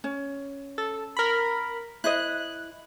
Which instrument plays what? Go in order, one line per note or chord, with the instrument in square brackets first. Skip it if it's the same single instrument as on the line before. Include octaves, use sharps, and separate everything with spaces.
[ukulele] C#4
[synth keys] A4
A#4 B5
[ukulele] E4 C5 D#5 [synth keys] F#6